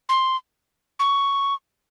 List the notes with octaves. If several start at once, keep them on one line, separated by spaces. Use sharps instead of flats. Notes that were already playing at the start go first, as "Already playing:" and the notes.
C6
C#6